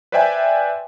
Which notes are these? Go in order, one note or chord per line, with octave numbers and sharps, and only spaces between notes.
B4 C5 D5 E5 G5 G#5